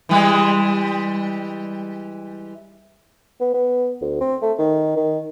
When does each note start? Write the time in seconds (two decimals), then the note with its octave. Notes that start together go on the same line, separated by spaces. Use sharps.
0.09 E3 G3 G#3
3.40 B3
3.54 B3
4.02 D2
4.21 C4
4.42 A3
4.59 D#3
4.97 D#3